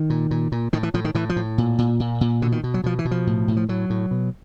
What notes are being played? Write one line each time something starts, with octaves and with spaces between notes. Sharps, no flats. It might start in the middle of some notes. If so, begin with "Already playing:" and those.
Already playing: D#3
A#2
A#2
A#2
A2 D#3
E3
A2 F3
D#3
A2 E3
F3
A2
A#2
A#2
A#2
A#2
B2 D3
D#3
B2
F#3
B2 F3
E3
B2
F3
A2
A2
F3
A2 F#3
A2
B2